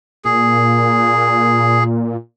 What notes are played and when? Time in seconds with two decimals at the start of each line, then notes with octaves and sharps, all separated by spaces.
0.25 A#2 G#4